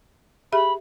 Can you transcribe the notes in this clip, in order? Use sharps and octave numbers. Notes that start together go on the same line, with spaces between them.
G4 G#4 E5 B5